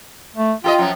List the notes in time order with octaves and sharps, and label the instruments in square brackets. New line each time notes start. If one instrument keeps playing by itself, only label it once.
[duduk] A3
[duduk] F4 [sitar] G4 A4 D#5
[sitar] F#2 F3 F#3